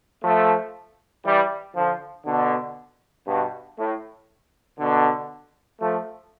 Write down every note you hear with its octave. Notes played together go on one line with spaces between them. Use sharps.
F3 A3
E3 G3
D3 F3
B2 D3
G2 B2
A2
B2 D3
F3 A3